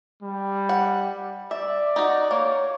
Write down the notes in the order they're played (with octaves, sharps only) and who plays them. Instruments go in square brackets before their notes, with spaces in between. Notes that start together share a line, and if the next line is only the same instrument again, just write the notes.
[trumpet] G3
[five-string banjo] F#5
[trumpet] D5 [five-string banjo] E5
[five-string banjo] D#4 F#4
[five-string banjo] A#3 [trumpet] C#5